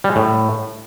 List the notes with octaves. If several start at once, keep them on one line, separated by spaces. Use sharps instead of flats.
G3
G#3
A2